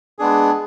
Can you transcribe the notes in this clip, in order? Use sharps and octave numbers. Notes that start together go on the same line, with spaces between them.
G#3 B3 D4 G#4